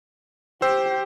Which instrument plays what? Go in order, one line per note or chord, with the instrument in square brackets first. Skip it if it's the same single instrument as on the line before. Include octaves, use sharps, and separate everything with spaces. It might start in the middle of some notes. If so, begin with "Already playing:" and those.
[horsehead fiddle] G4 [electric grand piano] C5 E6